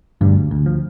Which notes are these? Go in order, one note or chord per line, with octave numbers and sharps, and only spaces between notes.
D2 G2 G3
D2
F3